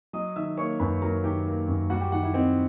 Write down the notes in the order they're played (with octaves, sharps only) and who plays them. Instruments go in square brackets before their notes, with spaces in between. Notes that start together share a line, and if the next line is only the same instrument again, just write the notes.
[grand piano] F#3 D#5 D#6
D#3 E5 E6
A#3 C#5 C#6
F#2 B4 B5
F#3 A#4 A#5
D#3 G4 G5
A#3
F#2
G3 F#4 F#5
G4 G5
D#3 F#4 F#5
E4 E5
C4 D#5